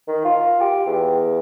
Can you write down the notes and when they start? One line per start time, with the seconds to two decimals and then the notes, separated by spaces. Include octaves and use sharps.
0.08 D#3
0.25 F4
0.61 G4
0.87 E2